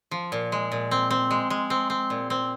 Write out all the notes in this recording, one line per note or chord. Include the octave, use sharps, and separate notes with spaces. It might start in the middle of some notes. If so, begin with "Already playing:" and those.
F3
A#2
G#3
A#2
C4
C4
G#3
G#3
C4
C4
A#2
C4